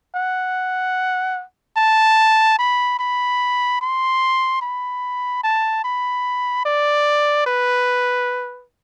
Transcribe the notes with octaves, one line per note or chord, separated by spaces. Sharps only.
F#5
A5
B5
B5
C6
B5
A5
B5
D5
B4